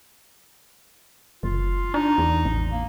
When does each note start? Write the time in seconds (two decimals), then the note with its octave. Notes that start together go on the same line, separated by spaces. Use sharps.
1.43 F#1 F4
1.94 D4 D#4
2.18 E2
2.45 A1
2.72 A#3